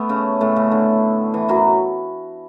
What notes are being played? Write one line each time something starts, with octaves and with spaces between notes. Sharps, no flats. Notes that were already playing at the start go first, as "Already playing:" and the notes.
Already playing: A3 B3 A4
C#3 C#4
A2 A3
C#3
D3
E3
F#2 F#3